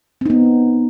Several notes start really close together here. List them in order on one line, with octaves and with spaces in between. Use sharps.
C4 D#4 B3